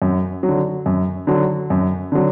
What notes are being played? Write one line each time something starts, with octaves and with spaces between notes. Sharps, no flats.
F#2
F#3
D3
F#2
D3 F#3
F#2
D3 F#3